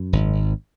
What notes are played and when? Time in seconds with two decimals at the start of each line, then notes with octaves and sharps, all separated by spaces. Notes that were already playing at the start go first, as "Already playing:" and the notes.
Already playing: F#2
0.13 G#1